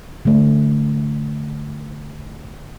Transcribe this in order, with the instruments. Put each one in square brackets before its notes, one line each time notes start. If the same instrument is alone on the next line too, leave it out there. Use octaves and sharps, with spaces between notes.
[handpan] D3 A3